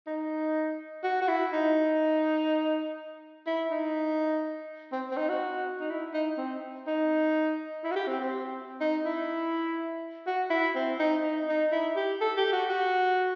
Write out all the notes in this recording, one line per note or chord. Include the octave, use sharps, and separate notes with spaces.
D#4
F#4
F#4
E4
D#4
E4
D#4
C4
C4
D#4
F#4
D#4
E4
D#4
C4
D#4
E4
F#4
G4
C4
C4
D#4
E4
F#4
E4
C4
D#4
D#4
D#4
E4
G4
A4
G4
F#4
F#4